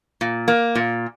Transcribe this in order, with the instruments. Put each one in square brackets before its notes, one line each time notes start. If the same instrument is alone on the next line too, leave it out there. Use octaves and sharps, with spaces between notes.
[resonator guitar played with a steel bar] A#2
A#3
A#2